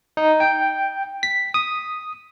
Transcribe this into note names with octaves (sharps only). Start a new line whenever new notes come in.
D#4
G5
B6
D#6